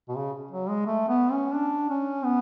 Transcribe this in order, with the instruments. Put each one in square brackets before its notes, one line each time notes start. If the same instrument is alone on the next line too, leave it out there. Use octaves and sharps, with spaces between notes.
[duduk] B2
C#3
F#3
G#3
A3
B3
C#4
D4
C#4
B3